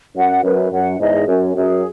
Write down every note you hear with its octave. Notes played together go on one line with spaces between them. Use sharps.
F#2 F#5
F#2 B4
F#2 F#5
E2 G#2 D#5
F#2 C#4
F#2 G#4